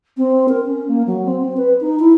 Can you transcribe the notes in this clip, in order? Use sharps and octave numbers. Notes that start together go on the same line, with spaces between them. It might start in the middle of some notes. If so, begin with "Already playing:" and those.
C4
A#4
C#4
A#3
F#3
C4
C4
B4
D#4
E4